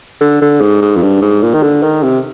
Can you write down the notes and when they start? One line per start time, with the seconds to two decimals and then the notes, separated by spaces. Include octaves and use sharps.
0.21 D3
0.41 D3
0.61 G#2
0.82 G#2
0.96 F2
1.02 G2
1.22 G#2
1.43 A#2
1.54 D#3
1.63 D3
1.83 D#3
2.03 C3